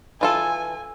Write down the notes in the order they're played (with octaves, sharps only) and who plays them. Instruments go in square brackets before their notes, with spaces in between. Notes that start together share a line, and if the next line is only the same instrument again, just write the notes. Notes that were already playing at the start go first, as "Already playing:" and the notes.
[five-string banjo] E3 F4 A4 [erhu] G#5